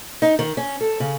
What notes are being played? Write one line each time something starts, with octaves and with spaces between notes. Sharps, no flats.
D#4
D#3
C#4
A4
C#3